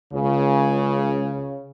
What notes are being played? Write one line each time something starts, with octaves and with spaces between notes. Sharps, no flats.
C#2 C#3